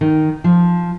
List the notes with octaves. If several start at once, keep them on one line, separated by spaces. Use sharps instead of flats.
D#3
F3